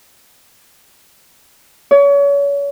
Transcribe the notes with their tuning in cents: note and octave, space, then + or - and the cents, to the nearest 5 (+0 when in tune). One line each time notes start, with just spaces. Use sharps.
C#5 +35